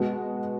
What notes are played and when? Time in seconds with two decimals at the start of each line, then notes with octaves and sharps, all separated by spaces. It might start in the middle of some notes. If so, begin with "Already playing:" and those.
Already playing: B2 G#3 B3 F#4